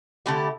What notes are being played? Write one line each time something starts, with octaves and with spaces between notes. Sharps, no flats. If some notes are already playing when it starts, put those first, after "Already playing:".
D3 A3 E4 G4